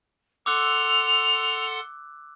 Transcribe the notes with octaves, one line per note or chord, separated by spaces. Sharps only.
A4 F#5 C6 D6 E6 F#6 F7